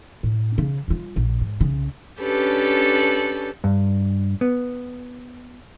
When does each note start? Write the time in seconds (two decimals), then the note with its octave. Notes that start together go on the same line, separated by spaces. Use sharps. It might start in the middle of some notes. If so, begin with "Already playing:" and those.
0.23 A2
0.58 C#3
0.88 G3 F4
1.16 A#1
1.41 G#2
1.61 C2 C#3
2.21 C#4 D4 G4 A4 B4
3.64 G2
4.41 B3